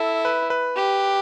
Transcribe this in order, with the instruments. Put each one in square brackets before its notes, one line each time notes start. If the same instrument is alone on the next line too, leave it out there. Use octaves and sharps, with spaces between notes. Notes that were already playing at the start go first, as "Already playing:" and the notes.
Already playing: [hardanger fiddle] E4 [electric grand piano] A4
[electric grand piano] B4
B4
[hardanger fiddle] G4